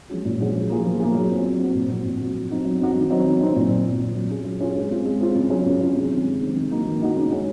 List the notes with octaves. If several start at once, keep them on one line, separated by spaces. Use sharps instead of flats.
F3 G#3 C#4 F#4
A#2
F3 G#3 C#4 F#4
F3
A#3 F4 G#4
F3
A#3 F4 G#4
F#3
C4 F#4
F#3
C4 F#4
A#2
F3 C4 F#4
A#2
F3 C4 F#4
F#3
C4 D#4 F#4
F#3
C4 D#4 F#4
D#3
F#3 C4 D#4
D#3
F#3 C4 D#4
A#2
F#3 C4
A#2
F#3 C4
F#3
C#4 F4 G#4
F#3
C#4 F4 G#4
G#3
C4 F4
G#3
C4 F4
C#3
F#3 C#4 F4 G#4
C#3
F#3 C#4 F4 G#4
C3
D#3 G#3 C4
C3
D#3 G#3 C4
D#3
A#3 D#4 F#4
D#3
A#3 D#4 F#4
C#3
G#3 C#4